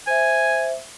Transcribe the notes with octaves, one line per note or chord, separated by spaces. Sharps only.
C5 E5 G#5